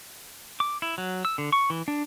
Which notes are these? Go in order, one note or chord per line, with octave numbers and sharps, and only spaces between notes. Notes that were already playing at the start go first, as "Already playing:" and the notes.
D6
E4
F#3
E6
D3
C#6
E3
D4